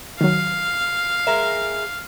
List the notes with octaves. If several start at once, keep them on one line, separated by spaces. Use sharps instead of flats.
D#3 F#3 F5
G#3 A#4 E5